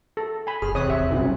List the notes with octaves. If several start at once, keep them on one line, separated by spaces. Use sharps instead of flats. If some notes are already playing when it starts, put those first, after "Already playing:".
A4
G#5 B5
F#1 G#4 F6
E2 C3 C#5 D#6 F#6
D1 G#1 E2 E5
C2 F#2 B2